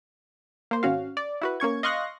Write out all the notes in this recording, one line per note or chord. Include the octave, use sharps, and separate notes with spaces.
A#3 C5
G#1 C#4 F#4 F5
D5
E4 F#4 B4
A#3 C#4 C#6 G#6
D#5 F5 C6 C#6 F#6 A#6